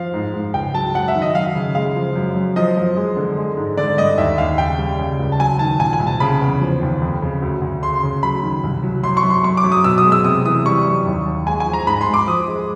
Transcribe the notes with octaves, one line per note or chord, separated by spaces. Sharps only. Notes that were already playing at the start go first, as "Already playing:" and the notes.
Already playing: F3 F5
G#2
G#2
C#2 G5
F#3 A5
F#2 F#5
E5
D#3
D#5
F#3 F5
C#3
G#3 F5
F3
F#2
F#2
F3 D#5
F3
G#3
D3
G#3
G#2
D3 D5
G2 D#5
D#2 E5
D#2 F5
C#3 G5
G3
C#3
C#2
A5
F#3 G#5
D#3 A5
A#2 G#5
G#5
C2
A5
C#3 B5
E2
F3
D#2
F2
C#3
D2
D2
C#3 C6
C#3
F#3 B5
D#3
C2
F#3
F#2 C6
C#6
F#2
C6
F#2 C#6
D6
F#2
D#6
B2 E6
D#6
G#3
E6
C3 D#6
E3 D#6
G3 C#6
F#2
D#2
D#2
G#3 G#5
G#5
F3
A#5
G#2 B5
C6
G#2
D6
F3 D#6
G#3